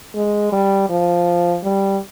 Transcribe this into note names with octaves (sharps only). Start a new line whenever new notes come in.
G#3
G3
F3
G3